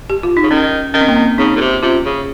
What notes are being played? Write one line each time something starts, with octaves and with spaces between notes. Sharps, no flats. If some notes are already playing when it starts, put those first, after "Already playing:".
G4
F4
D#4
C#3
D#3 C#4
D#3 C#4
C4
A#3
C4
C#3 C4 D#4
A#2
C3
C3 C#4 F4
C#3